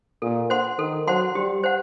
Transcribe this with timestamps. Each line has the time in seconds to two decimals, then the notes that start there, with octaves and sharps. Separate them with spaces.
0.22 A#2 A4
0.50 C5 F#5 C6
0.79 D#3 A4
1.07 F#3 C5 F#5 C6
1.35 G3 G4
1.64 C5 F#5